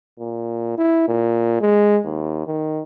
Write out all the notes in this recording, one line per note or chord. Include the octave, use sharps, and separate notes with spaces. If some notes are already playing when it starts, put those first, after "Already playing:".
A#2
E4
A#2
G#3
D#2
D#3